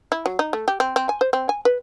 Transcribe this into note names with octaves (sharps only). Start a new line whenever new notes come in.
E4
F#3
D#4
A3
G4
C4
C4
G#5
C5
C4
G#5
B4